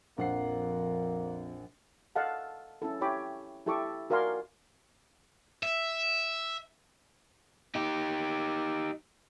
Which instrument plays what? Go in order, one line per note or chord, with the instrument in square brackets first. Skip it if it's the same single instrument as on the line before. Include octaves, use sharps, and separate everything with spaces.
[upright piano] A#1 F#5 C7 [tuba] F2 [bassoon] A#3
[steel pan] A4 D#5 F5 F#5 A5
C#4 E4 A4
E4 G4 C#5 G5 B5 D6
E4 G4 A4 E5 C#6 D6
F#4 A#4 D5 F5 G#5 C6
[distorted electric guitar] E5
[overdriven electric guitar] D#4 G4